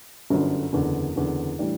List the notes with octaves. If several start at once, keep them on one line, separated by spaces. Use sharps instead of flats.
G1 F#2 D3
F#1 E2 D3
F#1 E2 D3
A2 E3 G3 D4